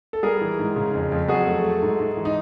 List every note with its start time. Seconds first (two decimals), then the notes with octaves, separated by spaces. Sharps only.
0.13 A4
0.23 G3 G#4 A#4
0.41 E3
0.59 G#2
0.76 C#3
0.94 F2
1.12 F2
1.28 F#3 F#4 G#4
1.47 A3
1.64 A3
1.82 G#2
1.99 G#2
2.17 E3
2.25 D#4